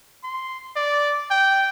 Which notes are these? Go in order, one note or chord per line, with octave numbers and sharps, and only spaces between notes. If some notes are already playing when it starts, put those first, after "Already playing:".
C6
D5
G5